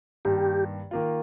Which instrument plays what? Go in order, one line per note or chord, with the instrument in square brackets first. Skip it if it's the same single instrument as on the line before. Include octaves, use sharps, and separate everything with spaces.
[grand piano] G2 D#3 A#3 [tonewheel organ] G4
[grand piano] D#3 A#3 F4